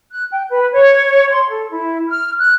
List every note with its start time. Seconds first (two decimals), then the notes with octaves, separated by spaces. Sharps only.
0.10 F#6
0.31 G5
0.48 B4
0.72 C#5
1.32 C6
1.48 A4
1.70 E4
2.08 F6
2.39 F#6